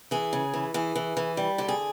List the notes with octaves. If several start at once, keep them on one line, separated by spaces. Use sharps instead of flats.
E3 G#4
C#3
E3
E3 G#4
E3
E3
G3
D3 G4
G#4